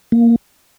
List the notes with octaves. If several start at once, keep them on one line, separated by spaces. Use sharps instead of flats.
A#3